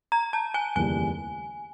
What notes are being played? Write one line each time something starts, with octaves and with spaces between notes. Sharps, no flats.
A#5
A5
G#5
F1 D#2 C#3 E3 G3 G#5